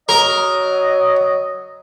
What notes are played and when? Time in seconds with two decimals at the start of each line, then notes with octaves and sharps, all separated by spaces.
0.09 F#3 A#4 D#5